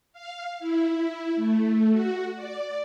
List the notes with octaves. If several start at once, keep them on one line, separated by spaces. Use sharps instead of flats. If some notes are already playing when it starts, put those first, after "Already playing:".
F5
E4
A3
F#4
D5